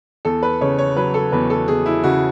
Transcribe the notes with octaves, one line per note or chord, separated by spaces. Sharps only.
E2 A4
B4
C#3 C#5
C#5
F#3 B4
A4
E2 B4
A4
E2 G#4
E4
C#3 F#4